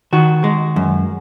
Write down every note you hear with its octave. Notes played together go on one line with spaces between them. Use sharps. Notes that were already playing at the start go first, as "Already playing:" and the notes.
D#3 F#4
G#3
F#2